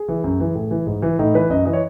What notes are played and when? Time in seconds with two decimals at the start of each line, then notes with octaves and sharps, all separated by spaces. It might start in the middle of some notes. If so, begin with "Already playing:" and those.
Already playing: G#4
0.08 E3
0.24 F#2
0.40 E3
0.55 A2
0.71 E3
0.87 G#2
1.02 E3
1.19 A2 D#4
1.34 E3 B4
1.50 F#2 D#5
1.65 E3 D#5
1.73 C#5